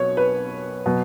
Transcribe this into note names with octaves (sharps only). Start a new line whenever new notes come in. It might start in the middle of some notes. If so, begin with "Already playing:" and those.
Already playing: B1 B2 F#3 C#5
B4
B2 F#3